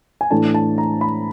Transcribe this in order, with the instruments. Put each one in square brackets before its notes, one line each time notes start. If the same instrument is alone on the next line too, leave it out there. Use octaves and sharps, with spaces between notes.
[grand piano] G#5
A2 E3 A3 D4 A5
A5
A#5
B5